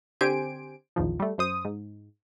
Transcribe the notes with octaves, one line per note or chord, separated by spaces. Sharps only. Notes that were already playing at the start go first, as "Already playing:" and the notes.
D3 C4 G4 C5 G#5 D7
A#1 E2 D#3 F3
G3 A3
F#2 C5 D#6
G#2